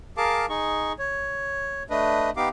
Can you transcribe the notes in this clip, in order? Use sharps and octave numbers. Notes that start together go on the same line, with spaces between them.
G#4 A#4 F5 A5 D6
D#4 G#4 C#6
C#5
A3 D4 B4 D#5
B3 D#4 G4 F5 D6